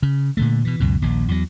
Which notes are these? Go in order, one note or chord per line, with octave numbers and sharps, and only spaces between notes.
C#3
A#2 D3 A3
B2 E3
C#2 F#2 B2
A#1 D#2
E2 F#3